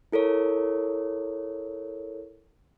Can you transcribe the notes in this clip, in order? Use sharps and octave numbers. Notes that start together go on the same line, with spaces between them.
E4 A4 A#4 C#5